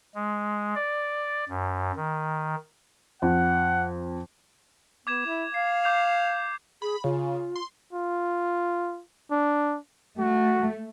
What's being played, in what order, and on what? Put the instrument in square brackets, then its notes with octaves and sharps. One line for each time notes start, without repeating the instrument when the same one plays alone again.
[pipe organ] G#3
D5
F#2
D#3
[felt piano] F2 [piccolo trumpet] F#5
[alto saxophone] B3 [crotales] D6 G#6 E7
[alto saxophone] E4
[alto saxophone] F5 [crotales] C7
[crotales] D6 G6 F7
[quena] G#4 [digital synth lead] B5
[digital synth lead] C#3 [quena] F4
[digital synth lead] C6
[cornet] F4
D4
[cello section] A3 [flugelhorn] F#4